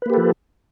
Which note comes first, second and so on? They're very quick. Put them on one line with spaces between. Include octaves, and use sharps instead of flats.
B4 A#3 G4 A4 F3